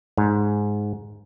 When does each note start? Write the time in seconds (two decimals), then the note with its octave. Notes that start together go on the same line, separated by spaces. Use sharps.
0.18 G#2